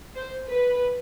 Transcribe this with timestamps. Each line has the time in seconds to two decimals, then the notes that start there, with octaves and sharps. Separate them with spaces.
0.16 C5
0.50 B4